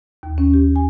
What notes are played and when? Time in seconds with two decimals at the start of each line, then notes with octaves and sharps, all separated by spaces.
0.23 D#2
0.38 C#4
0.54 G4
0.76 G#5